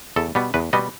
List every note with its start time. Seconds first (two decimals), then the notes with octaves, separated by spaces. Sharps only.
0.16 E2 A4
0.35 B2 G3 B3
0.54 E2 B4
0.73 B2 G3 B3 D#5